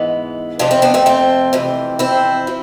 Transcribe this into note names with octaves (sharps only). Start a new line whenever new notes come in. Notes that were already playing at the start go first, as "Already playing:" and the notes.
Already playing: G#2 E3 G#3 B3
F2 C3 F3 D4 F4
C4 E4
B3 D4
A3 C4
A3 C4
F2 C3 E3
C4 E4
F3